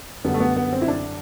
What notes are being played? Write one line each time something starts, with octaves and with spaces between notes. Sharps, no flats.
F#2 D3 G3 B3
A3
B3
B3
C4
E4
D4